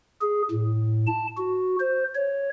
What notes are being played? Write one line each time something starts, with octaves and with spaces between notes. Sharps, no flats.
G#4
A2
A5
F#4
C5
C#5